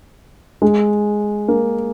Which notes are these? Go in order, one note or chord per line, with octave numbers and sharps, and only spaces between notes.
G#3
A#3